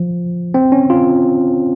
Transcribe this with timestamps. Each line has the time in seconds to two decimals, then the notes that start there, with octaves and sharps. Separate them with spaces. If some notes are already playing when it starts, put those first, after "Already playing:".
Already playing: F3
0.54 C4
0.72 C#4
0.90 F4